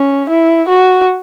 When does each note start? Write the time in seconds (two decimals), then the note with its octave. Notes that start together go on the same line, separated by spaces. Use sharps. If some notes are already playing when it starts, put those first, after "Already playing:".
Already playing: C#4
0.30 E4
0.68 F#4